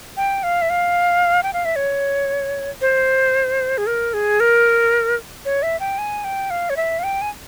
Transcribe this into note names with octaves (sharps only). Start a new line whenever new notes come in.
G5
F5
E5
F5
G5
F5
E5
C#5
C5
G#4
A#4
G#4
A#4
C#5
E5
G5
G#5
G5
F5
C#5
E5
F5
G5
G#5